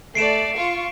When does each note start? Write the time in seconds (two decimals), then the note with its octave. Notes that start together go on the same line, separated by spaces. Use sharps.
0.15 A3 D5 C7 D7 E7
0.56 F4 F5 C#6